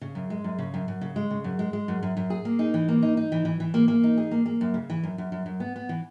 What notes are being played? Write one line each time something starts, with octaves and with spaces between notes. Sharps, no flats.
C#3
F#2
G#3
F#2
C#3
F#2
F#2
C#3
G#3
C#3
F#2
G#3
G#3
F#2
F#2
F#2
G#4
A#3
D#4
E3
A#3
D#4
D#4
E3
E3
E3
A#3
A#3
D#4
G#4
A#3
A#3
F#2
C#3
E3
F#2
F#2
F#2
F#2
B3
B3
E3